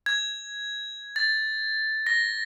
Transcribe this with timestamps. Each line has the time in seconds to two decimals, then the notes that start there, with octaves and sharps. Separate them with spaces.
0.06 G#6
1.16 A6
2.07 A#6